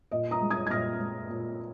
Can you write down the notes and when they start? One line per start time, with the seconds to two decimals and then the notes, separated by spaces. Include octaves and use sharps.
0.11 A#2 D#5
0.31 A#5 D#6
0.41 G#3
0.50 D#6 G#6
0.67 G#6
0.70 A#2 F6 A#6
0.99 G#3
1.29 A#2